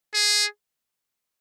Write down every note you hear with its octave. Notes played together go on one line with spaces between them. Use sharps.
G#4